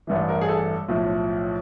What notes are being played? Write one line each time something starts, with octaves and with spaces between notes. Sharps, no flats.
A1 G2 E3
A#4
G#4
A4
B1 A2 F3